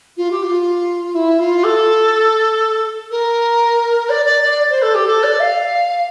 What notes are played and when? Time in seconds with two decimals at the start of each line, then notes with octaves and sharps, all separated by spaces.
0.17 F4
0.30 G4
0.43 F4
1.14 E4
1.39 F4
1.63 A4
3.10 A#4
4.09 D5
4.25 D5
4.42 D5
4.70 C5
4.82 A4
4.94 G4
5.07 A4
5.23 D5
5.40 F5